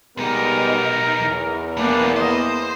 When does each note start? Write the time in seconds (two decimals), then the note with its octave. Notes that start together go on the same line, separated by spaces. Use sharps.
0.17 B1 G3 G#3 B3 D#4 A#4
1.21 E2
1.77 E3 G3 A#3 B3 D4
2.16 C5 D#5